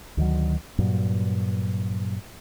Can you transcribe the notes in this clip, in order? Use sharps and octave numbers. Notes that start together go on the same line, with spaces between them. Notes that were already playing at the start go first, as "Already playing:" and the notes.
D2 D#3 F#3
G2 A#2 F#3